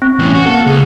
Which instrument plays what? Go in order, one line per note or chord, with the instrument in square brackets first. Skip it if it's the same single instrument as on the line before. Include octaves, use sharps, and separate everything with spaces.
[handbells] C4
[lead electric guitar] E2 A2 [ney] C#4
[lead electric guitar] F#4
[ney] A#3 [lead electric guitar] A4 [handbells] F#5
[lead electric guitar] C#2 [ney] G#4